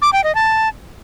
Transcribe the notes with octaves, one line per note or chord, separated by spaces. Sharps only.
D6
G5
D#5
A5